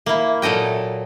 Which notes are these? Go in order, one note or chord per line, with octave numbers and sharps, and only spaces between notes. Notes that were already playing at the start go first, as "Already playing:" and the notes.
A#3 E4
A#2 F#3 A4 D#5 G5